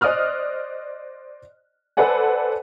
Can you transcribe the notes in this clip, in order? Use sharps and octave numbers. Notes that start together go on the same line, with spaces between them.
C5 D5 D#5 D#6 F6 F#6
A4 B4 C5 D5 F#5 G#5